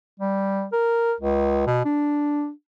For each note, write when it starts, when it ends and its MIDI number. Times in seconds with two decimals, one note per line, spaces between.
0.19 0.65 55
0.73 1.13 70
1.20 1.66 37
1.66 1.84 47
1.85 2.50 62